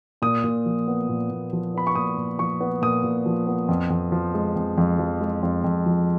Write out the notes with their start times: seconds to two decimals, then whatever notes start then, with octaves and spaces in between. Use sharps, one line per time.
0.22 A#2 D#6
0.44 A#2
0.66 F3
0.87 B3
1.09 A#2
1.30 A#2
1.53 F3
1.74 B3 B5
1.87 C#6
1.95 A#2 D#6
2.17 A#2
2.39 F3 C#6
2.61 B3
2.82 A#2 D#6
3.04 A#2
3.26 F3
3.47 B3
3.69 F2
3.90 F2
4.12 F3
4.35 G#3
4.56 F2
4.78 F2
4.99 F3
5.21 G#3
5.43 F2
5.64 F2
5.86 F3